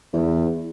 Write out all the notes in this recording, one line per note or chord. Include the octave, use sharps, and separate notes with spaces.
E2